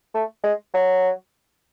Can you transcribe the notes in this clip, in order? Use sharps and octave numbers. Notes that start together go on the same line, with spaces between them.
A3
G#3
F#3